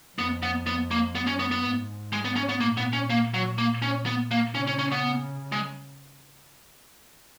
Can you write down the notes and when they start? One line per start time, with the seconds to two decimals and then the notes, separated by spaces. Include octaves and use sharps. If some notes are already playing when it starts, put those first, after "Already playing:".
0.17 F2 B3
0.43 B3
0.67 B3
0.91 A#3
1.15 F#2 B3
1.27 C#4
1.39 B3
1.51 B3
1.64 G#2
2.13 G#3
2.25 B3
2.36 C#4
2.49 B3
2.60 A#2 A#3
2.77 B3
2.93 C#4
3.10 A#3
3.34 F#3
3.58 A#3
3.82 C#4
4.06 B3
4.31 A#3
4.55 C#3 C#4
4.67 C#4
4.79 C#4
4.92 B3
5.52 G#3